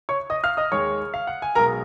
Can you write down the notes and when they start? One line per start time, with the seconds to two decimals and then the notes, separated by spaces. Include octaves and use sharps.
0.09 C#5 C#6
0.30 D#5 D#6
0.44 F5 F6
0.57 D#5 D#6
0.72 D#2 D#3 G#3 C#5 C#6
1.14 F5
1.27 F#5
1.42 G#5
1.55 B1 B2 G#3 A#4 A#5